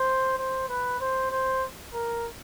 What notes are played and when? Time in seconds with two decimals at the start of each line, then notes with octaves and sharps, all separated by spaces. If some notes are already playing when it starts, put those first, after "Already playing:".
Already playing: C5
0.39 C5
0.69 B4
1.00 C5
1.31 C5
1.94 A#4